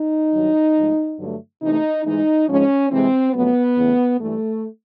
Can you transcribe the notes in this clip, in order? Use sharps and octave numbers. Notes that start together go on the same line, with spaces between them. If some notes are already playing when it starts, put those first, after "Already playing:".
Already playing: D#4
G2 D#3 F#3
G#2 F3 A3
G2 D3 F#3 A3
C3 E3 A3 D#4
G#2 E3 G#3 D#4
G#2 F3 G#3 C#4
C3 E3 G#3 C4
F2 C#3 F#3 A3 B3
E2 C#3 E3 A3
G2 E3 G3 A3